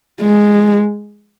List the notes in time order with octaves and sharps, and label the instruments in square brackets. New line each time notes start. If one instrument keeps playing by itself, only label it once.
[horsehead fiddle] G#3